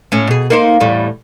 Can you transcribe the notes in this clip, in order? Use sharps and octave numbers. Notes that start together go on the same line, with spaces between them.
A2 C#4
B2 G#4
A#3 D#4 C5
E2 A2 G3